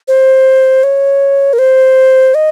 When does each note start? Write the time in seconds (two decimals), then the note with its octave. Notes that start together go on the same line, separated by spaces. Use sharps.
0.08 C5
0.84 C#5
1.53 A#4
1.59 C5
2.35 D#5